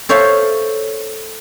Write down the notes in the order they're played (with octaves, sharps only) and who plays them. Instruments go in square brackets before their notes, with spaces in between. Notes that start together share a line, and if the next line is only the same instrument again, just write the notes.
[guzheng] A4 C5 C#5 E5 F5